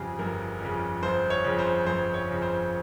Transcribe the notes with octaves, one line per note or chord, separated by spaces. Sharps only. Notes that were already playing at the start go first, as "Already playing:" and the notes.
Already playing: G1 F2 C#3 G4 G#4
G1 A#4
F2 C#3
G1 C5
C#5
F2 C#3
C5
G1 C5
C#5
F2 C#3
C5